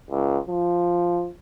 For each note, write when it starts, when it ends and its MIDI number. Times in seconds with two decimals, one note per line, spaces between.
0.11 0.37 37
0.49 1.28 53